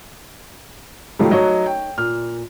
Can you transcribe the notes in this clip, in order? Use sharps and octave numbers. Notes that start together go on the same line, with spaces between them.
D#3 F#3 G3 A3 D#4 F4
F#3 D#4 F#4 C#5 D#5
G5
A#2 F6